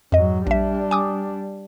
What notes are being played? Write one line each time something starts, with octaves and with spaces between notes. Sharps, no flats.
F2 G#2 F#3 D#5
A#1 G3 D4 E5
G#5 D6 D#6